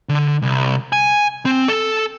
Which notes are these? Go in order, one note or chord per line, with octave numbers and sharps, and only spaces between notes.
D3
C2
G#5
C4
A4